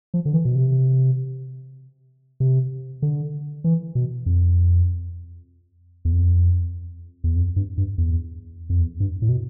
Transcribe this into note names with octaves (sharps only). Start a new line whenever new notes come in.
F3
D3
E3
B2
C3
C3
D3
E3
B2
F2
E2
F2
E2
F2
G2
G2
E2
F2
E2
G2
A2
B2